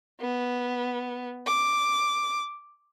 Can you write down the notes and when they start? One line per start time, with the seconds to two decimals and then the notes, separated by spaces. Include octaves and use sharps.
0.20 B3
1.47 D6